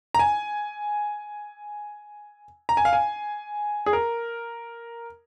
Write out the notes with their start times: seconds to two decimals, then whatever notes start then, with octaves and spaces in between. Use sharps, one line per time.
0.14 A#5
0.19 G#5
2.69 A#5
2.77 G#5
2.85 F5
2.93 G#5
3.86 G#4
3.93 A#4